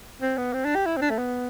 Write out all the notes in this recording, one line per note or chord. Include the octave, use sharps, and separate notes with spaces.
C4
B3
C4
D4
G4
E4
C4
D4
A3
B3